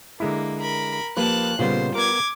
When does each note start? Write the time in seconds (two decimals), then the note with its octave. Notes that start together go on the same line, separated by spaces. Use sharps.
0.20 D3 G#3 A#3 E4
0.61 A#4 B5
1.17 F3 A#3 G4 B4 A5 F#6
1.59 A#2 C#3 G3 B3 F4 C5
1.95 B3 A#4 D6 G#6